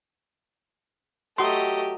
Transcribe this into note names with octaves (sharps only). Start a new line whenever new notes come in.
F#3 A3 G4 D#5 C6 D#6